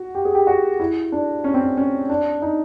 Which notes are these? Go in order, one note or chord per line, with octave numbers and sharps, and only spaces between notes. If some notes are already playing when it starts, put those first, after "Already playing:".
Already playing: F#4
G4
G#4
G4
F#4
E4
D4
C#4
C4
C#4
C#4
D4
D#4